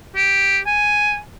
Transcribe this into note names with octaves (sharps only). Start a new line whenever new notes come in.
G4
G#5